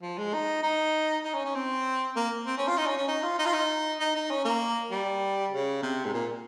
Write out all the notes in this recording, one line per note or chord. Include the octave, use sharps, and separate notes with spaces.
F3
G#3
D#4
D#4
D#4
C#4
C#4
C4
A#3
C4
C#4
F4
D#4
C#4
C#4
D#4
F4
D#4
F4
D#4
D#4
D#4
C#4
A#3
G3
C#3
C3
G#2
A#2